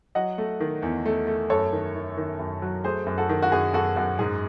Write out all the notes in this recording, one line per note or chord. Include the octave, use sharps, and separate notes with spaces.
F#3 D#5 F#5
A3
D#3
E2
A3
A3
F#2 A4 C#5
D#3
D#3
D#3
F#2
F#3
A3 G#4 C5
F#2
F#4 A4
D#3
F#4
F#2 G#4
F#2 F#4 A4
F#2 F#4
G#2 G#4